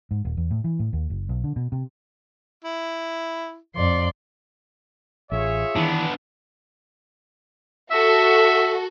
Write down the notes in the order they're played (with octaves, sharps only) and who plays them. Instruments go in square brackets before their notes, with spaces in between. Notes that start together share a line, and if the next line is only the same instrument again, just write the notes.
[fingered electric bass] G#2
D#1
E2
A2
E3
A2
D#2
F#1
B1
D3
B2
C3
[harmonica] E4
[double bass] F2 [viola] D5 C6
[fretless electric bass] A1 [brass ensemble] F4 G#4 C#5 [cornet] E5
[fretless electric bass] D#3 E3 [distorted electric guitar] B3 D4
[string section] F#4 A4 [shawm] E5